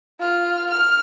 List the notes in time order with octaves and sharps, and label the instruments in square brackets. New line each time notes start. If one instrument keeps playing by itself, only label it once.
[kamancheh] F4 F6
F6